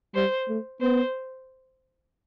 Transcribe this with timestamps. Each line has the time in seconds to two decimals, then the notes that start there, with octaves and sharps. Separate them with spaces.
0.15 G3 C5
0.48 A3
0.81 B3 C5